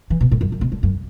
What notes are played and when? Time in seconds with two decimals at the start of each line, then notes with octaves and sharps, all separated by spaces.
0.10 E3
0.21 B2
0.31 A2
0.41 F#2
0.52 F#2
0.61 B2
0.72 D3
0.83 F#2